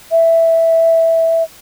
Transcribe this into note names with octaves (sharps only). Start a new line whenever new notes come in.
E5